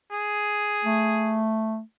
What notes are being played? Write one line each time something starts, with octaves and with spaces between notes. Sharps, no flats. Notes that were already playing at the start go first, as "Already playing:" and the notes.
G#4
A3